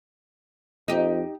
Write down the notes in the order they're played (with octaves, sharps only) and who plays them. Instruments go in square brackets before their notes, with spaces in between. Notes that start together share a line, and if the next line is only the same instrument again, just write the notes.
[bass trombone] F2 [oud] D#4 G4